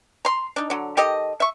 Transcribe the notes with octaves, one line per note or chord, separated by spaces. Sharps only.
A#5 C6
D4 D#4
D3 F#3
D#3 G4 A4 D#5
E5 C#6